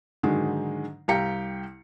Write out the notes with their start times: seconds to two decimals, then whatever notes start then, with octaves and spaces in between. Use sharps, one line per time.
0.23 G#2 D3 D#3 F#3 G#3
1.08 C2 G4 F5 G5 A#5 C#7